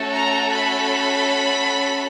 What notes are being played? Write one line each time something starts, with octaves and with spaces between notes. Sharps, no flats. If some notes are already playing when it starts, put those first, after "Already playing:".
Already playing: A3 C#4 F#4 A4
A#5
B5